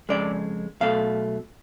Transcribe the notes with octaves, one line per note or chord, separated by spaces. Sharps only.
F2 C#3 G#3 D5
B1 B2 A3 F5